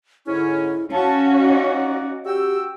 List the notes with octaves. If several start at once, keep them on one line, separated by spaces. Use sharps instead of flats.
G#2 D3 C#4 E4
C#4 F#4 F5 A5
D#4 D5 F#5
F#4 G4 G5 E6